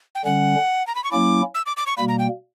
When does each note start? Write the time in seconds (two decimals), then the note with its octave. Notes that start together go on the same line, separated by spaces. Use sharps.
0.15 G5
0.25 D3 G3 C#4 F#5
0.87 A#5
0.95 B5
1.04 C#6
1.11 F#3 A#3 C#4 E4 D6
1.55 E6
1.66 D6
1.77 D6
1.86 C#6
1.97 B2 G3 A#3 B5
2.08 A#5
2.19 G5